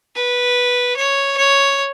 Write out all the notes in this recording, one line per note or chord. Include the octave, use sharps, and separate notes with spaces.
B4
C#5
C#5